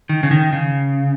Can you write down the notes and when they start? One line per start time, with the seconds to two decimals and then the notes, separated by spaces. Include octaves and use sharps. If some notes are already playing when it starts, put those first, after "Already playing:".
0.09 D#3
0.23 C#3
0.31 D#3
0.53 C#3